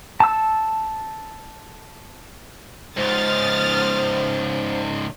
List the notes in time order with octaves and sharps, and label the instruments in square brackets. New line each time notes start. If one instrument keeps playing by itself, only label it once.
[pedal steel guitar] A5 E6
[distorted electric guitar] C#2 G#2 [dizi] C5 [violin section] D#6 F6 A6